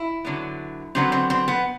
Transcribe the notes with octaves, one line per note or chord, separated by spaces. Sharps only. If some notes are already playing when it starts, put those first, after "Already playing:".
Already playing: E4
D3 F#3 B3
D3 F#3 B3 C4
C4
C4
B3